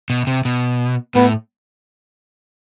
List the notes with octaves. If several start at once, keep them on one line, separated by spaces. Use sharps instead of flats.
B2
C3
B2
A2 B3